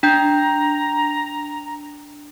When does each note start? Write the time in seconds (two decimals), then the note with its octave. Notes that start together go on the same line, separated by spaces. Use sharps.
0.03 D4 G5 A#5 G6